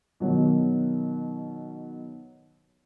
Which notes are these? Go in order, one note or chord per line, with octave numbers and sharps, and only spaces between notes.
B2 D#3 F#3